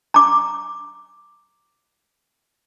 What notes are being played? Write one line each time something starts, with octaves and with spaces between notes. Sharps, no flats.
A#5 D6